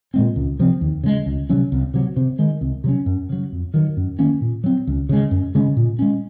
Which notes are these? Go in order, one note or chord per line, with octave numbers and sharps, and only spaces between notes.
A#2 G#3 C4
C#2
C3 F3 C4
D#2
C#3 G#3
C#2
C3 F#3 C#4
C2
C3 F#3
C3
D#3 G#3
C2
C3 F#3 C#4
F#2
C#3 F#3
F2
D#3 F#3
F#2
D#3 A#3 C#4
A#2
F#3 C4
C#2
C#3 G#3
F#2
C#3 G#3 C#4
A#2
G#3 C#4